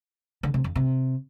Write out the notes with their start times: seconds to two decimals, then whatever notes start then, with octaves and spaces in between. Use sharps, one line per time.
0.43 D3
0.54 C3
0.64 F2
0.76 C3